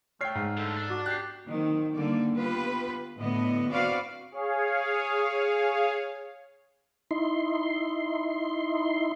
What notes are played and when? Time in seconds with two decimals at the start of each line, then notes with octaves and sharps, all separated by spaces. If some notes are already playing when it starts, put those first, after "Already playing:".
0.21 A3 C#5 G5 F6 C7
0.35 G#2
0.57 A2 D3 A4
0.76 D4
0.90 F#4 D5
1.06 G4 F#6 C7
1.48 D#3 F#3 A#3 C4
1.95 D3 G3 A#3 D5
2.36 B3 F4 G4 B4
3.19 A2 D3 B3 D#5
3.71 C4 F#4 B4 D5 F5
4.32 G#4 C#5 F5
7.11 D#4 E4 C6